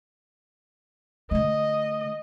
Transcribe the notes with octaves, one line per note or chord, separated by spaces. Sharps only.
D3 A3 D#5